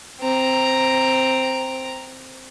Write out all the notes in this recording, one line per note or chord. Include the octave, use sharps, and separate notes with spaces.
C4 A#5